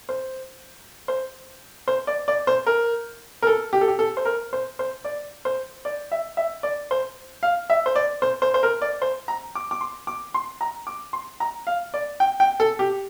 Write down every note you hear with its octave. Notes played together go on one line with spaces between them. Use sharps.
C5
C5
C5
D5
D5
C5
A#4
A#4
A4
G4
A4
G4
A4
C5
A#4
C5
C5
D5
C5
D5
E5
E5
D5
C5
F5
E5
C5
D5
C5
C5
C5
A#4
D5
C5
A#5
D6
D6
C6
D6
C6
A#5
D6
C6
A#5
F5
D5
G5
G5
A4
G4